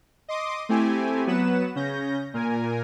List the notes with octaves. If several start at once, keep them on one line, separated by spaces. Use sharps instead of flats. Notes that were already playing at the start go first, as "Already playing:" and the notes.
D#5 C6 D6 D#6
A3 C4 E4 G4 G#5
F#3 B3 B4 F#5 E7
C#3 C#4 G6 A#6
A#2 A#4 G#5